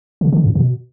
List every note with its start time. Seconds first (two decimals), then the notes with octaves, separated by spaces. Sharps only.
0.21 C#3
0.33 D3
0.44 F#2
0.55 B2